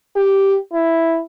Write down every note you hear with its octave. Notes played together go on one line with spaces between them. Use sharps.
G4
E4